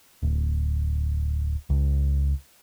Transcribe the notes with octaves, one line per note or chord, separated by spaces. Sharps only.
D1
C#2